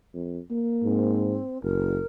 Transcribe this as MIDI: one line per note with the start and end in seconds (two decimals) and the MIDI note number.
0.14 0.39 41
0.51 1.47 58
0.83 1.39 44
0.83 1.61 60
1.62 2.00 30
1.62 2.06 70